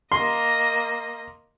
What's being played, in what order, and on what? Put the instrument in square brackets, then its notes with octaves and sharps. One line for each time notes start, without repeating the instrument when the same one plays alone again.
[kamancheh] A#3 D#5 [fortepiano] C6